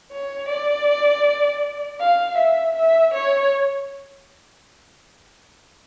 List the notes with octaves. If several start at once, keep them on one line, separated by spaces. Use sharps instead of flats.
C#5
D5
F5
E5
E5
C#5